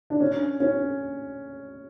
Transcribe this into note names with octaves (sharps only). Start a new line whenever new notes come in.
D4
C#4
C#4